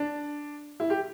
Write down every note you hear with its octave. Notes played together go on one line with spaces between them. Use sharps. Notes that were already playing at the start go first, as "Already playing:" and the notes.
Already playing: D4
E4
G4